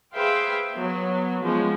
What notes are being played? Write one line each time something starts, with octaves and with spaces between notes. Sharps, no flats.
G#4 B4 C5 E5 F5 G5
F#3 B3
F3 G#3 B3 C#4